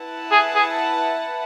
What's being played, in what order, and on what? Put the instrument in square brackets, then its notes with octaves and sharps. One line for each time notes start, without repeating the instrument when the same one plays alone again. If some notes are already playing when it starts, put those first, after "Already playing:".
Already playing: [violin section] E4 B4 F#5 A5
[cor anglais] G#4
G#4